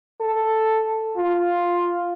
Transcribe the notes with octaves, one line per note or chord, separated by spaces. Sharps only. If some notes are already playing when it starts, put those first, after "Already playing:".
A4
F4